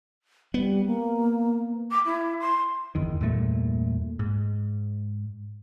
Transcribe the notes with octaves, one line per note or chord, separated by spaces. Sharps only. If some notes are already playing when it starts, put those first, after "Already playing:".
G3 B3
A#3
D6
E4
C6
G1 E2 D#3
E2 G2 A#2 A3
G#2